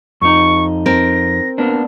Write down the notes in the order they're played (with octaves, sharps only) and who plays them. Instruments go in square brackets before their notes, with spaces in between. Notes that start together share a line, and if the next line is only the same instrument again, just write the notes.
[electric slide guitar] F2 D#4 [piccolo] C#6
[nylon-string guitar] C4 A#4 [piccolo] A#6
[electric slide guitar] A#3 B3 D4